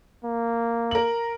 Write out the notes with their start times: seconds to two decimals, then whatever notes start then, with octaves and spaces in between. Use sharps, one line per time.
0.24 A#3
0.91 A#4 F#7